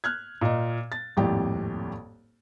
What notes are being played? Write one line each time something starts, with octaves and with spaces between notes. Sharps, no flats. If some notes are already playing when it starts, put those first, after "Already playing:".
F6 F#6 G#6
A#2 D#5
A6
D#1 G#1 F2 A2 G4